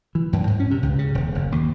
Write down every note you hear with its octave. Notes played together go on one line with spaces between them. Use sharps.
E3
F#2
G#2
C#4
C3
C#2
C#3
D#1
F#1
D#2